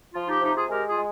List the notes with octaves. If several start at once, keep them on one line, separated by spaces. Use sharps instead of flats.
F3 F4
D#4 G4
C3 D#4 G4
F4 G#4
G#3 G4 A#4
F4 G#4
G#3